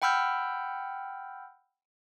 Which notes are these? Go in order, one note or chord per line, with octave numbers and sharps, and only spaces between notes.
F#5 G5 B5 E6 F6 G6